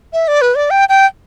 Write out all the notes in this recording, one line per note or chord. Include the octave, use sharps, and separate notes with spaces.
E5
D5
B4
D5
G5
G5